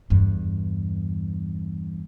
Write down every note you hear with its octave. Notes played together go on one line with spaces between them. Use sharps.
E2 G2